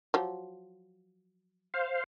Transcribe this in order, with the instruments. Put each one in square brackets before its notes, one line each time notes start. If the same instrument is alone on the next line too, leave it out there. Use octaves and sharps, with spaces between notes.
[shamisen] F3 F#3 G4
[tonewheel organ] C5 F5